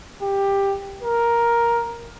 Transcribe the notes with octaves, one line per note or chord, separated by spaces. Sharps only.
G4
A#4